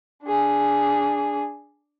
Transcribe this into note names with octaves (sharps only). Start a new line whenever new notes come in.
D4 G#4